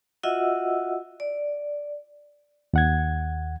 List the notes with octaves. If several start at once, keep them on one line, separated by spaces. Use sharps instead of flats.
F4 F#4 D#5 E5 F#5 E6
D5
D#2 F#5 G#6